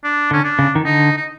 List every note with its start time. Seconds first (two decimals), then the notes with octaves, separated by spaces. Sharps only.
0.04 D4
0.31 D3 C#4
0.44 D4
0.59 C#3
0.75 D#3
0.85 D3 D#4
1.17 D#4